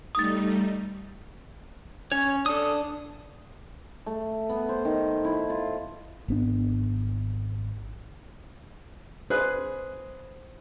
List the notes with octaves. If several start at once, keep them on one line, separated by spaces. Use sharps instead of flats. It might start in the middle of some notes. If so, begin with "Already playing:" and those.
G3 A3 D#4 D#6 A6
C#4 C#5
D4 A4 D#6
A3
B3
C5
D#3
E4
F4
G#1 B3 D4
G#4 B4 C5 F#6